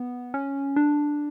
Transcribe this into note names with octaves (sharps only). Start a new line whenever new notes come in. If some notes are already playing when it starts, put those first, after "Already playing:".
Already playing: B3
C#4
D4